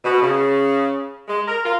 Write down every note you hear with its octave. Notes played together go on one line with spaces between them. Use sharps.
B2
C#3
G#3
A#4
F4